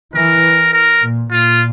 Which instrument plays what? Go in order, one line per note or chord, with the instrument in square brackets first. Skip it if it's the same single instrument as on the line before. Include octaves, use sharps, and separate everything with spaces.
[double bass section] E3 [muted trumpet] A#4
[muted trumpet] A#4
[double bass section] A#2
[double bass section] A#2 [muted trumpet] F4